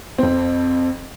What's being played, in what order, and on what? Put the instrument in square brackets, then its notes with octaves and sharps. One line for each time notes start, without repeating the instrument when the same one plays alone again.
[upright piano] F2 C4